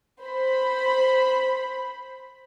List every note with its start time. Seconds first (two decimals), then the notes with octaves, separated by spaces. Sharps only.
0.21 C5 B5